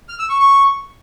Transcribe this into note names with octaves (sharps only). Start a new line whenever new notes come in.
F6
E6
C#6
C#6